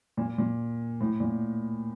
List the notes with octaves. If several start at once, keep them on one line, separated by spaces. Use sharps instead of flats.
A#2
A#2
A2
A#2